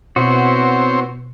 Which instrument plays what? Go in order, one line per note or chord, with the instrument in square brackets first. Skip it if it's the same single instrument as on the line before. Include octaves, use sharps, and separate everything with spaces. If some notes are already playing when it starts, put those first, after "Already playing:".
[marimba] B2 [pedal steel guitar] B3 E4 F#4 [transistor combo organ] C4 C5 C#5